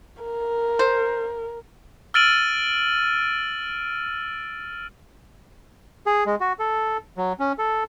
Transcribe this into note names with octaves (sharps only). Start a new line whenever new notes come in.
A#4
C5
E6 F6 A6 D7 D#7 F#7
G#4
G#3
F#4
A4
F#3
C#4
A4